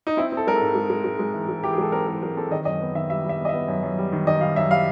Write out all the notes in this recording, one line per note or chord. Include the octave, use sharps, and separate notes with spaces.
D#4
C4 E4
C4
A4
G#3 A#4
G#2 A4
G#3
G#3
G#3
G#3
E3
G#3
E3 G4
G#4
G#3 A4
C4 A#4
E3 A#4
G#3 A#4
C4 A4
D#3 D#5
F#2 D#5
B3
D#3 E5
G3 E5
G3
E5
B3
D#5
B3 E5
F#2
F#2
G3
D#3
D#3 D#5
G3 F5
F#2 E5
G3 F5